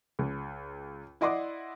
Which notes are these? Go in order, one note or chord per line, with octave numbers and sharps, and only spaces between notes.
C#2
E4 D5 D#5 F#5 C6 D6